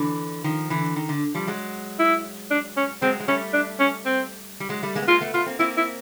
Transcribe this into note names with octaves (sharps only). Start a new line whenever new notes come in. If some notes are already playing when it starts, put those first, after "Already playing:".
Already playing: D3 E3
D#3 F3
D3 E3
D#3
D3
F3 G3
F#3 G#3
E4
D4
C#4
F#3 G#3 C4
G#3
G3 A3 C#4
D4
C#4
C4
G3
F#3 G#3
G3 A3
G#3 A#3
B3
G#3 A#3 F4
A3 B3
A3 B3 F4
A#3 C4
A#3 C4 E4
E4